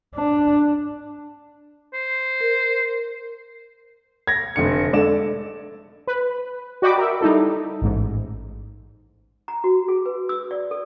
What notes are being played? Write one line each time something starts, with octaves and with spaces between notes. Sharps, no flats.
D4
C5
A#4
G#6 A#6
F1 D3 C#7
G#3 D4 A4 D5 E7
B4
F#4 D5 D#5 G5 B5 D6
A#4 E5
G3 D#4 E4 A4
A1 G#2
A#5
F#4
G#4
B4
E6
D5
A4